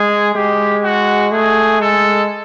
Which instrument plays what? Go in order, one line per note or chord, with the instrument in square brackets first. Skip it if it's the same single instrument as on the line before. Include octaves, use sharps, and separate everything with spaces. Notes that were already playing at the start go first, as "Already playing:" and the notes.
Already playing: [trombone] G#3 [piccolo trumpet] G#4
[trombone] G#3 [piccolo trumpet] G4
[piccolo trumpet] F#4
[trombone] A3 [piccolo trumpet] G#4
[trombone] G#3 [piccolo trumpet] A4